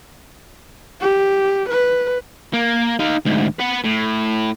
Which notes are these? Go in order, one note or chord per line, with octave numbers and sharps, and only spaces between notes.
G4
B4
A#3
D#4 F5
D2 G#2
B4 F#5
A2